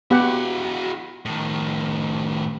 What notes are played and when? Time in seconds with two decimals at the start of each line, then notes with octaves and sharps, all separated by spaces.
0.11 B3 E4 F#4 G4 F#5
1.25 A2 D#3